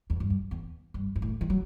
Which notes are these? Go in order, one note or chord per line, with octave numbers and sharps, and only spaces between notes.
E2
G2
F#2
E2
G2
G2
A2
E3
F#3